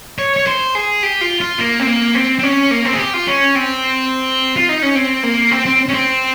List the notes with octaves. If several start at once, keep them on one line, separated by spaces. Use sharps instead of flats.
C#5
C#5
C5
G#4
G4
F4
F4
A#3
C4
A#3
C4
C4
C#4
A#3
C4
G#4
G4
F4
C#4
C4
F4
D#4
C#4
C4
A#3
C4
C4
C#4
C4